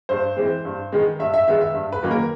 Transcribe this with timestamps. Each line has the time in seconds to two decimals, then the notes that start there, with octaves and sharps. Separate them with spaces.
0.09 G2 C5
0.36 E3 G#3 C4
0.65 G2
0.92 D#3 G#3 B3
1.19 G2 E5
1.34 E5
1.48 D#3 G#3 B3 E5
1.61 E5
1.74 G2
1.93 B4
2.03 D#3 F#3 A#3 C#4
2.11 A#4